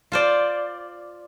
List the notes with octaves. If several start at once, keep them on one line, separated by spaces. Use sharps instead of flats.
F4 C5 D5